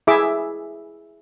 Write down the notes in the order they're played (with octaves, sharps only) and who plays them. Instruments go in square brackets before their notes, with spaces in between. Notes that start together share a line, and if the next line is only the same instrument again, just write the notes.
[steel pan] E4 G#4 E5 D6